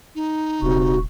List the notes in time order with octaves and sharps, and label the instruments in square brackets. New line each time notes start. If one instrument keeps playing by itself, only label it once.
[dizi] D#4
[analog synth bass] D#1 [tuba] C3 [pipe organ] F#4